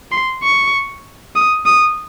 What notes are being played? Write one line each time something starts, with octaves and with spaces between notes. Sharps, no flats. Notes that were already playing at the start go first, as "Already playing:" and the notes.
C6
C#6
D#6
D#6